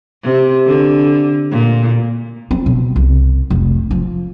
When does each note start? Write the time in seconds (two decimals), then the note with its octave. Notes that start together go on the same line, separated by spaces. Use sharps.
0.23 C3
0.65 D3
1.51 A#2
2.51 C4
2.66 B2
2.96 C2
3.50 F1
3.91 F3